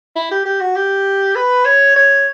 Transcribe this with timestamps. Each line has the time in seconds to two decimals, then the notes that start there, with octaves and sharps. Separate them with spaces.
0.16 E4
0.31 G4
0.45 G4
0.61 F#4
0.76 G4
1.35 B4
1.65 C#5
1.96 C#5